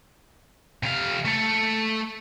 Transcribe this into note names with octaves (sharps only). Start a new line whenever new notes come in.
C3 F5
A3 A4